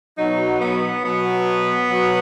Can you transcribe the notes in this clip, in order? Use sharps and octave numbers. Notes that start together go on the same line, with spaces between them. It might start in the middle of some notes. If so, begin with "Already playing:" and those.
B2 F#3 D#4
B3
B2 F#3 B3
B2 F#3